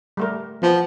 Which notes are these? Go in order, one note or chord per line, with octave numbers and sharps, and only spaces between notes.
G3 A3 A#4
F3 B3